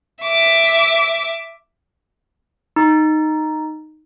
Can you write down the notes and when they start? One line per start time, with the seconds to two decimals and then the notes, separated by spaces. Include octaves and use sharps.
0.23 E5 D6
2.76 D#4